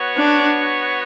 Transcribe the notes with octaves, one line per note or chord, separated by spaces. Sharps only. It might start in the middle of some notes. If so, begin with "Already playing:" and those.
Already playing: B3 F#4 C#5
D4